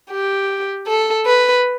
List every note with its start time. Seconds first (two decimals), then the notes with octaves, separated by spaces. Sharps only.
0.10 G4
0.87 A4
1.26 B4